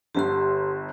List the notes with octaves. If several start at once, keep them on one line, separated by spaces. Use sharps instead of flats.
G1 D3 G4 C6